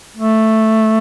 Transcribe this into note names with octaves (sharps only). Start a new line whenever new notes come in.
A3